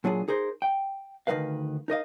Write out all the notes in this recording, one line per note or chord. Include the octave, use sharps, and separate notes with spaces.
A#2 F#3 D4 F4 G#4
D#4 G#4 A#4 C5
G5
D2 D#3 G3 A#4 B4 F5
D#4 A#4 D#5 F5